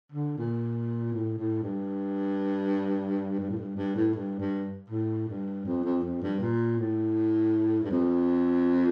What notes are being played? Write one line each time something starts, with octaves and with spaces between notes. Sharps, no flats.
D3
A#2
A2
A2
G2
G2
A2
G2
G2
A2
G2
G2
A2
G2
F2
F2
F2
G2
A#2
A2
G2
F2